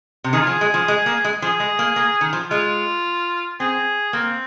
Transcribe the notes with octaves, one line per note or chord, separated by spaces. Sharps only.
C3
D#3 G#4
F4
F3 G#4
G#3
F3
G#3
A#3
G#3
F3 G#4
G#3
A#3
A#3
D#3
F3
G#3 F4
C4 G#4
A#3 C4